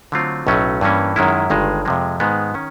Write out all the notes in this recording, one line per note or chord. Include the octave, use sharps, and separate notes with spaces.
D3 F#3 A3 C4 F4
B1 A2 F#3 A3 C#4
G2 E3 G3 A#3 C#4
F#2 D#3 G#3 C#4 E4
G1 G2 D#3 G#3
F2 C3 F3 G#3
G#2 D#3 G#3 B3
D#3 C#4